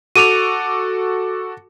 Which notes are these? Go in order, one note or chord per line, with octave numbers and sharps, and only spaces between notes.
F#4 A4 D6 D#7 F7